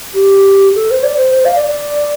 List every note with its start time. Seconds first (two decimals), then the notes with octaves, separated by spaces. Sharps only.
0.15 G4
0.76 A4
0.91 C5
1.03 D5
1.17 C5
1.35 C5
1.45 F5
1.55 D5
1.66 D5